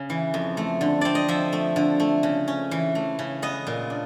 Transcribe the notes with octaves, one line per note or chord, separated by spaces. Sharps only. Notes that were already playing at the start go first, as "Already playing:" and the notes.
Already playing: C#3
E3
F2
A3
D3
C4 D5
D#5
F3 E5
A3
D3
A3
C#3
C#4
E3
A3
C#3
B3 D#5
A#2
D4